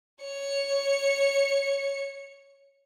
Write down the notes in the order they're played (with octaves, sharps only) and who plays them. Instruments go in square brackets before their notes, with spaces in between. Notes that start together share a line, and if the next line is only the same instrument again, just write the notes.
[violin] C#5 C#7